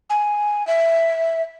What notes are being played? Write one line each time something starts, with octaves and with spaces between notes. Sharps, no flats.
G#5
E5